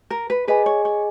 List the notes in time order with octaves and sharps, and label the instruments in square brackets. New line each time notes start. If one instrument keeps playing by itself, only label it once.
[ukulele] A#4
B4
[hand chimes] G#4 D#5 G#5 [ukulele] B4
[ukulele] C#5
C#5